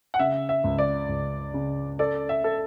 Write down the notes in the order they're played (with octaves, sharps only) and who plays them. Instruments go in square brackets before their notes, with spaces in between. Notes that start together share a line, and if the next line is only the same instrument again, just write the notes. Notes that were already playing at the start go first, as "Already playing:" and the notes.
[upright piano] F#5
[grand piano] C#3 [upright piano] E5
[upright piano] E5
[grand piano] C#2
[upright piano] D5
[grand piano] C#2
C#3
[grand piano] A4 [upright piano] D5
[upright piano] E5
[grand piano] A4